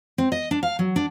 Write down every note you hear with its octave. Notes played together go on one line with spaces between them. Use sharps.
C4
D#5
D4
F5
F#3
D4